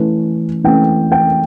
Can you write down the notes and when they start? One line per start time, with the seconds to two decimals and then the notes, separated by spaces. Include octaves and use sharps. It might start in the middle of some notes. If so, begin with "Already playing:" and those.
Already playing: E3 A3 C#4
0.64 E3 A3 C#4 G5
1.12 G5